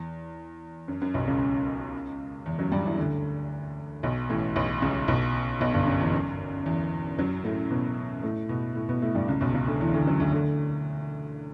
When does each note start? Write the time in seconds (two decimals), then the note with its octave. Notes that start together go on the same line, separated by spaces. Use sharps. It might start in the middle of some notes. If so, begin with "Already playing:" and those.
Already playing: E2
0.88 F#2
1.02 F#2
1.14 B1 B2
1.27 C#2 C#3
2.45 E2 E3
2.59 F#2 F#3
2.72 G2 G3
2.85 E2 E3
2.98 D2 D3
4.03 B1 B2
4.30 A1 A2
4.56 B1 B2
4.82 C#2 C#3
5.08 B1 B2
5.61 B1 B2
5.74 G1 G2
5.87 F#2
6.00 E2
6.13 F#2
6.66 E2 E3
7.19 F#2 F#3
7.44 A2 A3
7.71 B2 B3
8.23 A2 A3
8.49 B2 B3
8.75 A2 A3
8.89 B2 B3
9.02 A2 A3
9.15 G2 G3
9.28 C#2 C#3
9.41 B1 B2
9.54 C#2 C#3
9.67 D2 D3
9.81 E2 E3
9.93 D2 D3
10.07 F#2 F#3
10.20 D2 D3
10.33 D2 D3